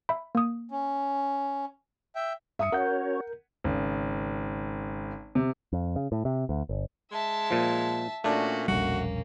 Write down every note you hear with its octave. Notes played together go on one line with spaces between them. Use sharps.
E5 B5
A#3 D#6
C#4
E5 G5
G2 E5 D#6 C#7
C#4 F#4 A#4 C#5 F#5 G6
G#1 C#3
C3
F2
C#3
A2
C3
D2
G1
G#3 E5 A5
A#2 F3
A#2 A3 C#4 D4 F#4
E1 A#1 G3 A#3 C#4 F#4